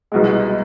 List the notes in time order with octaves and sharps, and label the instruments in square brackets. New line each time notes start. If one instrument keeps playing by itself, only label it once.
[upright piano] C2 B2 G#3